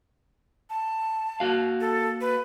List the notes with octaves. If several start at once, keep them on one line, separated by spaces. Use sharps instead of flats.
A5
A#3 F#4 F5
A4
B4